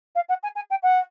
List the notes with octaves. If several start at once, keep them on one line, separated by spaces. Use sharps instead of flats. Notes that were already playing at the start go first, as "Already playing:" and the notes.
F5
F#5
G#5
G#5
G5
F#5